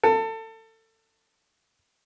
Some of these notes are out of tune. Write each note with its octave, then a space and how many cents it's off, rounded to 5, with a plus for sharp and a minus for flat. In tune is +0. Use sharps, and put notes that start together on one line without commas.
A4 +25